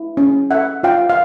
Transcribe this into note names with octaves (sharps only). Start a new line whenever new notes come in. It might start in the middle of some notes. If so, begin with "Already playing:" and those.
Already playing: E4
C#4
A4 E5 F#5
F4 F5 G5
F5